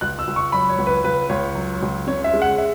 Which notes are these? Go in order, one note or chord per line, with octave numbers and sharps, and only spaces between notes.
C#2 F#6
E6
C#2
C#6
F#3 B5
C#5
C#2
B4
C#2 B4
C#2 C#5
F#3
C#2
C#3 C#5
E5
G#3
F#5
E5